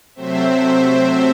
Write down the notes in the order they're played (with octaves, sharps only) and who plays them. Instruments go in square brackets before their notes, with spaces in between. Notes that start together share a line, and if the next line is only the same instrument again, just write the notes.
[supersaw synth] C3 F#3 A3 C4 C5 E5